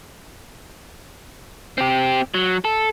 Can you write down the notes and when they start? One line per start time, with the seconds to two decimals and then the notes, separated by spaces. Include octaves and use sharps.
1.78 C4 G4
2.34 F#3
2.65 A4